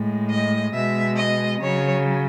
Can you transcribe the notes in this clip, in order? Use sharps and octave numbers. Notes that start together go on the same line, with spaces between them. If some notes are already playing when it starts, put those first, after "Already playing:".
Already playing: A2 G#3
D#5
B2 G#3 E5
D#5
C#3 F#3 C#5